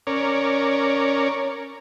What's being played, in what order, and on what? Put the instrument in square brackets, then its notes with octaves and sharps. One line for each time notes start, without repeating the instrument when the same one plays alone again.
[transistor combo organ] C#4 A#4 C#5 D5